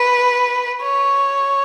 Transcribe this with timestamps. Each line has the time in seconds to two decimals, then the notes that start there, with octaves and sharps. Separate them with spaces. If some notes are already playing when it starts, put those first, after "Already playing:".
Already playing: B4
0.82 C#5